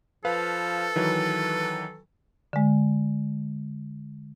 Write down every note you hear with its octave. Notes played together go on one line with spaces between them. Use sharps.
F3 A4 B4 F5
D#3 E3 F#3 B4
D3 G#3